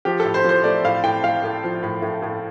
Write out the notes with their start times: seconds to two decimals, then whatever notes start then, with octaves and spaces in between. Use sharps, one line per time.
0.05 F3 G4
0.20 A2 A4
0.34 C5
0.44 F3 C5
0.64 A3 D5
0.85 A2 F5
1.04 A2 G5
1.23 A3 F5
1.44 A2
1.64 F3
1.83 A2
2.02 A2
2.22 A2